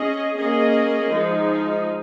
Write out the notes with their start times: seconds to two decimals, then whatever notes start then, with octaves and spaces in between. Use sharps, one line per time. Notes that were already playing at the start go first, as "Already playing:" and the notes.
Already playing: C#4 G#4 D#5
0.37 A#3 C#4 G#4 D#5
1.12 F3 G#3 D#4